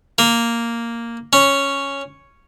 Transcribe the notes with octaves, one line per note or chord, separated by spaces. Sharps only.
A#3
C#4